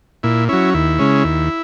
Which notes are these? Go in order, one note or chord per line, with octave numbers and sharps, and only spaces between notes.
A#2 E4
F#3 C#4 E4
D#2 E4
C#3 G#3 C#4
D#2